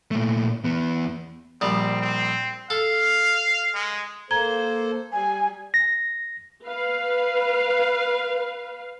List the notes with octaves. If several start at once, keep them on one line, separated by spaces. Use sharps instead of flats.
A#2 A3
E2 B3
A#1 G3 C4
C4
A4 F5
G#3
A#3 A4 C5 A#5 G#6 G7
G3 G#5
A#6
B4 F5